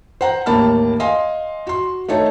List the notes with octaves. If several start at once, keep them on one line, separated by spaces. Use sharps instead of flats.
C5 F#5 A#5
A1 D#2 A#3 A5 B5 F6
D#5 F5 G#5 C6
F#4 C6
A3 D#4 C#5 A5